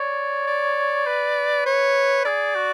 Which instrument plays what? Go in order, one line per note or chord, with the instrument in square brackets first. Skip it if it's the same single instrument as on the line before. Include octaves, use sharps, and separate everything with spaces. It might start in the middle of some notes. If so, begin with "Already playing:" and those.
Already playing: [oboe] C#5 [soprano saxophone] D5
[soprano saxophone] D5
[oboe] B4
[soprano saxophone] C#5
[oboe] G#4 [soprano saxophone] D5
[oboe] F#4